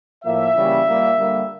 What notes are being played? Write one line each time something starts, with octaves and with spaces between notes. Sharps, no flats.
A2 F3 A#3 E5
C#3 E3 G3 A#3
A#2 G3 A#3
D3 G3 A#3